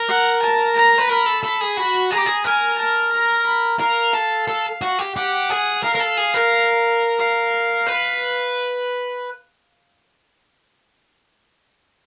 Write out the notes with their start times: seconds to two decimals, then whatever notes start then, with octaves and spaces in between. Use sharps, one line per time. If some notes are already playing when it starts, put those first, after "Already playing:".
Already playing: A#4
0.08 F#5
0.42 A5
0.76 A#5
0.98 B4
1.09 A#4 B5
1.26 A4
1.43 A4 B5
1.61 G#4
1.77 F#4 B5
2.11 G#4 A#5
2.18 G4
2.26 G#4
2.45 A#4 G#5
2.78 A5
3.12 A#5
3.46 B5
3.80 A#4 F5
4.14 A4
4.48 A4
4.81 F#4
4.99 G4
5.16 G4 F#5
5.50 G#4
5.83 A#4 F5
5.95 A#4
6.00 A4
6.17 G#4
6.34 A#4
7.19 F5
7.87 B4